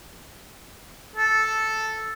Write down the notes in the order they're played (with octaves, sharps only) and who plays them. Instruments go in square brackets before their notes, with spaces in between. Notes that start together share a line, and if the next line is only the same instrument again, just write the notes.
[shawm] A4